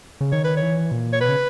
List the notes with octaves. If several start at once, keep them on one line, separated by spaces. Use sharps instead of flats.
C#3
D#3 C#5
B4
C#5
E3
A#2
C#5
B2 B4
C#3